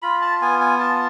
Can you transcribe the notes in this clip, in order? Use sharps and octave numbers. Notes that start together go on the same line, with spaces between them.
F4 B5
A5
B3 G#5
G#5
F4 A5